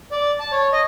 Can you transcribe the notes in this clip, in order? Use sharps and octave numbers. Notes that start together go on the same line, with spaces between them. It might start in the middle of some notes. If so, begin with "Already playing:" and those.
D5
A5
C#5
D#5